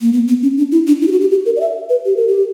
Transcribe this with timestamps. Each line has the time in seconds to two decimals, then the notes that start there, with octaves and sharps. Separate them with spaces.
0.02 A#3
0.13 B3
0.28 B3
0.42 C#4
0.57 D4
0.72 E4
0.87 D4
1.02 E4
1.07 G4
1.12 F#4
1.21 G4
1.31 G4
1.45 A#4
1.56 D5
1.60 E5
1.89 B4
2.05 G4
2.16 A#4
2.28 G4